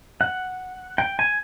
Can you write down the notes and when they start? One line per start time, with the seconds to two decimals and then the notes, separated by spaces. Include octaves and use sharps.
0.21 F#5
0.98 G5
1.19 G#5